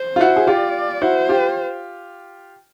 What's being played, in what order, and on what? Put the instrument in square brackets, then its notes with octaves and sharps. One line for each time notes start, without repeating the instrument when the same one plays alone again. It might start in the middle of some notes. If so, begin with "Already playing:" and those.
Already playing: [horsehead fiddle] C5
[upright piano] F4
E4 F#4
G#4
[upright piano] F4 G4 [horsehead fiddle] D5
[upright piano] E4 F#4 [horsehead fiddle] C5
[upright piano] F4 G4